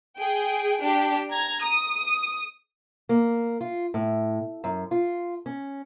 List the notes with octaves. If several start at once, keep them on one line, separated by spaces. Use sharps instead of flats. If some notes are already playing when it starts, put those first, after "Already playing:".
G#4 G5
D4 G4
A#5 G#6
D#6
A#3
F4
A2
F#2
F4
C#4